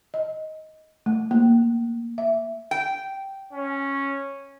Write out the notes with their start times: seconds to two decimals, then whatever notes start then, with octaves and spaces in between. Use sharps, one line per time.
0.14 D#5
1.06 A3
1.31 A#3
2.18 E5
2.71 G5
3.53 C#4